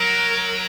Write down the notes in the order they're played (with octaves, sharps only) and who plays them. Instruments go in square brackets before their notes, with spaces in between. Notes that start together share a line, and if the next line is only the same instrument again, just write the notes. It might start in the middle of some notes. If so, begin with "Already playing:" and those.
Already playing: [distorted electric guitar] F#3 [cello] A#4